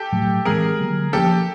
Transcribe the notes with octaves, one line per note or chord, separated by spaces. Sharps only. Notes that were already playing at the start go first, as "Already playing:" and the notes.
Already playing: G4 A4
A2 F#3 A3
E3 G#3 C4 G#4 A#4
D3 F#3 A#3
F3 A#3 C#4 G4 A4